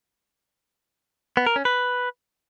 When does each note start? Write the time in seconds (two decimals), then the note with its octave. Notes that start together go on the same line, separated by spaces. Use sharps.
1.37 B3
1.46 A#4
1.56 C#4
1.65 B4